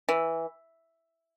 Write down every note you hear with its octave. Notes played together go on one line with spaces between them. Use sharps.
E3